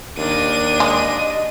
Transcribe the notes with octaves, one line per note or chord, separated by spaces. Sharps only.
D#2 D4 A#4 D#7
G#3 D#5